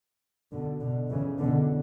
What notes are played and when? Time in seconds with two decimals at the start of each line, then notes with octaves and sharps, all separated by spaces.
0.51 B2 D3
0.81 B2 D3
1.09 C#3 E3
1.39 B2 D3